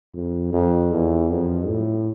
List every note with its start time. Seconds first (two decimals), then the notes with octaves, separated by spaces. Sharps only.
0.14 F2
0.53 F2
0.91 E2
1.30 F2
1.69 A2